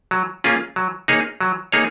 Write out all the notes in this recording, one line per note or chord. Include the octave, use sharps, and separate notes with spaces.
F#3
A#3 C#4 F4 G#4
F#3
A#3 D#4 G#4 C#5
F#3
A#3 D#4 G#4 C#5